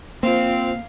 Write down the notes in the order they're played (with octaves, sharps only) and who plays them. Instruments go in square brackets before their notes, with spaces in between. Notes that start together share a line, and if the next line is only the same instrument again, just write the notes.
[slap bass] A#3 [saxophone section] C4 [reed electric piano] F4 C5 [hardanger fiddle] F5